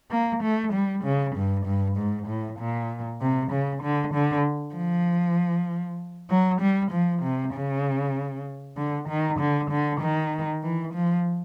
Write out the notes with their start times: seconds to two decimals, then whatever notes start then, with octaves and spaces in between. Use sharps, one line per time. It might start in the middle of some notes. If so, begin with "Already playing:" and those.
0.11 A#3
0.43 A3
0.73 G3
1.04 C#3
1.35 G2
1.66 G2
1.97 G#2
2.27 A2
2.59 A#2
3.21 C3
3.51 C#3
3.83 D3
4.14 D3
4.75 F3
6.30 F#3
6.61 G3
6.91 F3
7.22 C3
7.53 C#3
8.77 D3
9.08 D#3
9.39 D3
9.70 D3
10.00 D#3
10.63 E3
10.94 F3